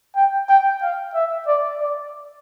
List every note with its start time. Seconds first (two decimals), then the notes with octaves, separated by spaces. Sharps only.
0.16 G5
0.49 G5
0.82 F5
1.14 E5
1.47 D5
1.80 D5